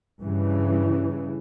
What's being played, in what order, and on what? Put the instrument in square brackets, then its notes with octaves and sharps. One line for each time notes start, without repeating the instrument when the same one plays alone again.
[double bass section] G2 C#3 E3